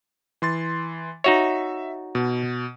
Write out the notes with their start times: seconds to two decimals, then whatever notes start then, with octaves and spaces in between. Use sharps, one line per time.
0.42 E3 C6 A6
1.24 D#4 F#4 C#5 E5
2.15 B2